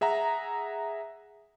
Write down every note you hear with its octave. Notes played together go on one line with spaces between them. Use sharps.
G#4 E5 F#5 A#5